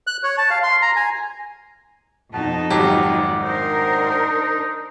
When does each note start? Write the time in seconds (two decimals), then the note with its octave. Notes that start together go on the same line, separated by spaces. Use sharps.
0.07 F#6
0.24 C#5
0.38 A5
0.50 F5
0.63 C6
0.82 A#5
0.96 G#5
2.34 F2 B2 D#4 A5
2.70 G#1 F#3 G4 D5
3.44 D4 D#4 A#4 C5